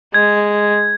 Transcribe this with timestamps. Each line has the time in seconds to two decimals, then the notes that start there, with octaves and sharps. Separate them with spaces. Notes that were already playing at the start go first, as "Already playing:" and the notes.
0.14 G#3 G#6